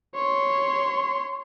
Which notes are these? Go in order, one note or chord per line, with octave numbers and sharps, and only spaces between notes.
C#5 C6